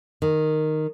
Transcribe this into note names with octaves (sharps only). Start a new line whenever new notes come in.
D#3